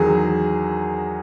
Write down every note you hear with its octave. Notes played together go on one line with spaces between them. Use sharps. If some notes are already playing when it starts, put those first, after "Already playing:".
Already playing: E2 D#3 F#3 G#4